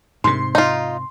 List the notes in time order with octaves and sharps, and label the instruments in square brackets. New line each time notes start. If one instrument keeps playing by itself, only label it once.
[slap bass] G#2 C3 [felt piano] C6
[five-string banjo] D#4 F4